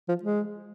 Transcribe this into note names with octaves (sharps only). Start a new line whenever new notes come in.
F3
G#3